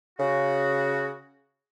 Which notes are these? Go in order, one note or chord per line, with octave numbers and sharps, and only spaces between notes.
C#3 F#4